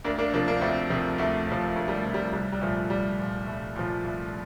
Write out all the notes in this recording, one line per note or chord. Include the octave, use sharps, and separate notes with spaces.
D2 A#3 D4
A#3 D4
C3 F3 A#3 D4
A#3 D4
D2 A3 C4
C3 F3 A3 C4
D2 A3
C3 F3
D2 A3
G3
A3
C3 F3
G3
C2 G3
G3
A#2 F3 A3
C2 G3
A#2 F3
C2 A3
A#2 F3
C2 A3